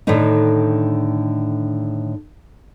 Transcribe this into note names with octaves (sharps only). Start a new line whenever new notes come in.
A2 D3 D#3 A3 D4 D#4